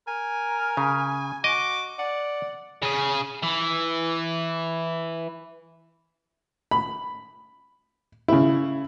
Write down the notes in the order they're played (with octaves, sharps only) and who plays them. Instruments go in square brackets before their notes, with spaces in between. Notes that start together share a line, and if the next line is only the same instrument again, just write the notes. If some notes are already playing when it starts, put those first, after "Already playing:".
[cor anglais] A#4 [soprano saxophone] G#5
[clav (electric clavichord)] C#3
[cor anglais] F#4 [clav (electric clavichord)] D#5 [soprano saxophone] D6
[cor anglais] D5 [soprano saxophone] F#5
[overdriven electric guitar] C#3 G#4
E3
[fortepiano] B5
C#3 E4